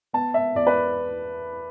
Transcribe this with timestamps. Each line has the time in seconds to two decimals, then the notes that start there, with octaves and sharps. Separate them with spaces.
0.13 B3 A5
0.34 E5
0.55 E2 D5
0.67 B4